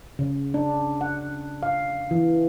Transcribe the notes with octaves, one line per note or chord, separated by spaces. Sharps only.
C#3
D4
F#5
F5
E3